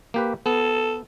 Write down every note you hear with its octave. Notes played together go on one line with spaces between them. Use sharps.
A#3 G4 B4
B3 A4